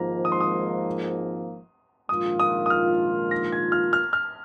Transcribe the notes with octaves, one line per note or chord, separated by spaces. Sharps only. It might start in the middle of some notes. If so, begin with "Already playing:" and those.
Already playing: G#1 G#2 F3 A#3 A#5
D#6
C6
D#6
A#1 G#2 D#3 A#3 F4 D#6
D#6
D#6
F6
A#6
G#6
F6
F6
F6